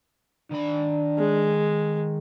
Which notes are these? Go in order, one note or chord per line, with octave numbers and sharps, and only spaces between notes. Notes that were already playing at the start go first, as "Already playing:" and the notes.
D#3 D4 B5
G#3